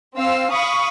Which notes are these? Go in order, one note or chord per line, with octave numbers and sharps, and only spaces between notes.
C4 F5 E6
F5 B5 C#6 D#6